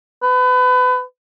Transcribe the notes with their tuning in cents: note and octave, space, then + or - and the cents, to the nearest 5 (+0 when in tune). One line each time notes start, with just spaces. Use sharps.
B4 +30